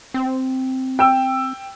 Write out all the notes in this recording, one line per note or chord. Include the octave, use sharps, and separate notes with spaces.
C4
G5 E6